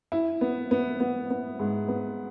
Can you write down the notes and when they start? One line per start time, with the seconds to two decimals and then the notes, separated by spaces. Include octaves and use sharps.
0.12 E4
0.41 B3
0.71 B3
1.00 B3
1.30 B3
1.59 G#2
1.88 B3